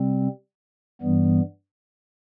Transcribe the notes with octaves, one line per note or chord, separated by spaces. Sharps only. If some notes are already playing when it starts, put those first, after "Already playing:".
Already playing: C3 G3 C4
G2 E3 G3 B3